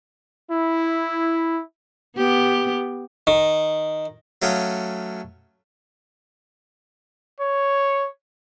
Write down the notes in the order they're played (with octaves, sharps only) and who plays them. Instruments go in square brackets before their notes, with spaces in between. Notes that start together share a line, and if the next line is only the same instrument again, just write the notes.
[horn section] E4
[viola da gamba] B3 G4
[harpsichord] D#3
F#3 A3 C#4 F5 G5 D#6
[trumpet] C#5